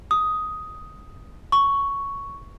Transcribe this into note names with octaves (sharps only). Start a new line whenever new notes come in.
D#6
C#6